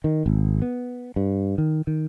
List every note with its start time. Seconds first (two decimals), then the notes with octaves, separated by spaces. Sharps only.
0.04 D#3
0.26 G#1
0.62 B3
1.16 G2
1.58 D#3
1.87 D#3